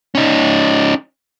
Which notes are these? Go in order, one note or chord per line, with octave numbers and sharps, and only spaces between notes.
C#4 D#4